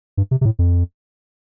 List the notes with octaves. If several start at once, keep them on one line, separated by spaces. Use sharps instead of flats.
G2
C3
C3
A2
F2